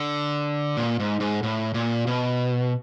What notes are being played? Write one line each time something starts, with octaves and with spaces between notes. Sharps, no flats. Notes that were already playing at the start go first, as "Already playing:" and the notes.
Already playing: D3
A#2
G#2
G#2
A2
A#2
B2